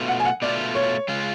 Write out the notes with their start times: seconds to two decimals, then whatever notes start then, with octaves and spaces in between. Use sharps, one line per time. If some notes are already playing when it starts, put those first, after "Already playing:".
Already playing: B2 A3 F4
0.08 F#5
0.20 G#5
0.25 F#5
0.42 B2 A3 F4 D5
0.75 C#5
1.08 C#3 G#3 C#4 F4